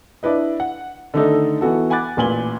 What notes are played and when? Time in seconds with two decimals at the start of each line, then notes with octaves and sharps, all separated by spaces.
0.23 D4 E4 B4 D#5
0.60 F#5
1.14 D3 D#3 A3 D4 D#4 A4
1.61 E3 B3 F#4 A4
1.90 F#5 G#5 B5 D6 F#6 A6
2.17 A1 A#2 B4 G#5 F#7 G7